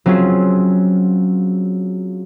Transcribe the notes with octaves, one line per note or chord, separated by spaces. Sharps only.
F#3 C4 C#4 F4 G#4